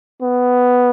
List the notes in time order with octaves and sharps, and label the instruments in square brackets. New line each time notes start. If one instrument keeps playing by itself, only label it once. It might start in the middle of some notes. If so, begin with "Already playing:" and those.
[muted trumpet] B3